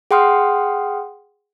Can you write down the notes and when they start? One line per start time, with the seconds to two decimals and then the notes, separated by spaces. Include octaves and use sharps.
0.11 G#4 F#5 G5 C6 D#6 F6